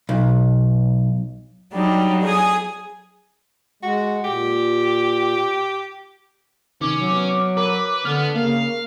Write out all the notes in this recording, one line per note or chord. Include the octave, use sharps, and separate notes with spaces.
B1
F#3 G3 D4 D#4
G#4 G#5 D#6
G#3 F#4
A#2 G4
C3 D#3 C#4 D6
F#3
B3
A#4 B4 C#5
D3 B3 F6
C#3 A#3 F5